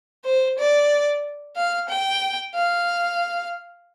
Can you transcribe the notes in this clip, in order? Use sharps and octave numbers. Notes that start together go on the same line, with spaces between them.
C5
D5
F5
G5
F5